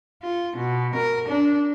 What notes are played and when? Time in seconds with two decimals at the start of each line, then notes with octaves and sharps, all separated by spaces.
0.23 F4
0.57 B2
0.95 A#4
1.28 D4